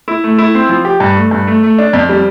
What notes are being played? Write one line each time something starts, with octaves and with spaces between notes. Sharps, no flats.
E4
A3
E4
C4
F3
G4
G2
A3
G2
A3
A3
D4
F2
G3